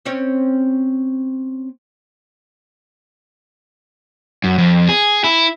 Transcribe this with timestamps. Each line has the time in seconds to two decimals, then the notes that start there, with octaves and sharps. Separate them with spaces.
0.05 C4 C#4 C#5
4.44 F#2
4.58 F2
4.89 G#4
5.24 E4